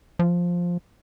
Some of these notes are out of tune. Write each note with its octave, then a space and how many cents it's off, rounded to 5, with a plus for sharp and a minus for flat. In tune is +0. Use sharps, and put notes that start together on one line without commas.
F3 +5